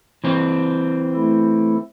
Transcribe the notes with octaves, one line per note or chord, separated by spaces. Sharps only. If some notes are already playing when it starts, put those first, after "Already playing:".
E3 C4
A3 E4 A4